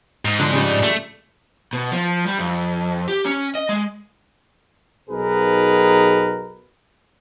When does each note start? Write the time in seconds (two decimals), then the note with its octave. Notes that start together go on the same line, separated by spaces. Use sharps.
0.25 G#2
0.39 D3 F3 F#3
0.53 C#3 F3 G3
0.83 A3
1.73 B2
1.92 F3
2.27 G3
2.39 F2
3.08 G4
3.25 C#4
3.55 D#5
3.69 G#3
5.10 B1 B2 D#4 G#4 A#4 B4